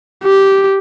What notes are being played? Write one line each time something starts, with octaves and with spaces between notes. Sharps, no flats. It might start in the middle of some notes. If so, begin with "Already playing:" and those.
G4